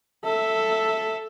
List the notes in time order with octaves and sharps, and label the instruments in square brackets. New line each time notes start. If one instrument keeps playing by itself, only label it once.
[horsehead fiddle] A4 E5